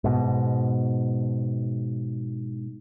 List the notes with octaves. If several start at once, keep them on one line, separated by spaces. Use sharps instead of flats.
G#2 B2